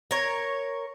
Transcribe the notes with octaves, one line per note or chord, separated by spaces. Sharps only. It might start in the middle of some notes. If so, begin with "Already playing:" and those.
A#4 C#5